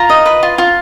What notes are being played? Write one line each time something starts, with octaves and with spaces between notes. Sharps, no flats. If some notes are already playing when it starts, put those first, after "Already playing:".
Already playing: F4 A#5
D#5
B4
F4
F4